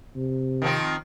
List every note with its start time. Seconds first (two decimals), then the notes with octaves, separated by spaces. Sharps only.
0.16 C3
0.62 D#3 F3 C4